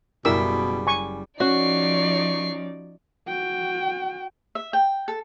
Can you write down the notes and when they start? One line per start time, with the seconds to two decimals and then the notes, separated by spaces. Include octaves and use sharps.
0.25 F#1 B2 G3 E4 A#4 B5 E6
0.87 G#5 C#6
1.40 F3 C#4 D#4 F#4 D5 C#6 C7
3.28 F#4 G5
4.55 E5
4.73 G5
5.08 A4